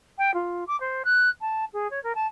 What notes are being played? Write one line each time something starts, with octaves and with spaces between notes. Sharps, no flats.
G5
F4
D6
C5
F#6
A5
G#4
C#5
A#4
A5